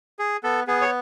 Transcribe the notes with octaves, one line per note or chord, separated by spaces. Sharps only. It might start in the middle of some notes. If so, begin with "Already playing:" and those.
G#4
B3 A4
B3 G#4
C#5